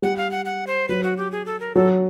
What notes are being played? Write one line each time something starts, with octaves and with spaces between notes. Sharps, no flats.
G3 F#5
F5
F#5
F#5
C5
F#3 B4
F#4
G4
G#4
A4
A#4
F#3 A4